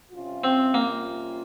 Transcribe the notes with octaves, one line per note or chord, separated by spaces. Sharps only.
C3 G3 C#4 F4
C4
A#3